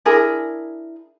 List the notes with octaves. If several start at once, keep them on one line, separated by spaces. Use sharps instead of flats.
D4 E4 G#4 A#4